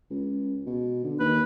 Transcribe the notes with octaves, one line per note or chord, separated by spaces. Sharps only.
C#2
B2
D3
D#2 B4